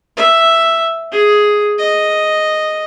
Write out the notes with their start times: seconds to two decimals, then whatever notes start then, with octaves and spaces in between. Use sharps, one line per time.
0.17 E5
1.12 G#4
1.78 D#5